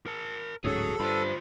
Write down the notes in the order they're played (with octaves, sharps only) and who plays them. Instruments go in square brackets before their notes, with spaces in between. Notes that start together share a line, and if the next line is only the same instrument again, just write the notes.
[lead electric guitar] A#4 A5
[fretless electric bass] D1 G#2 C#4 [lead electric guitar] F#4 C#5 [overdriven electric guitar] G#4 [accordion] A4
[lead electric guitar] D2 F4 [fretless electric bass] G2 [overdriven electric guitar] C5 B5